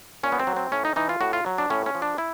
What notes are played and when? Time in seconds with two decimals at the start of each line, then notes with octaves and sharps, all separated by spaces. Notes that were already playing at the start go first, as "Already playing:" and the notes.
0.23 A#2 C#4
0.32 B3
0.39 C4
0.47 F#3
0.56 C4
0.72 A2 C#4
0.85 D#4
0.96 E3 D#4
1.09 F4
1.21 A2 F#4
1.33 F4
1.46 F#3
1.58 D4
1.70 A2 C#4
1.86 C#4
1.95 F3
2.02 D4
2.18 E4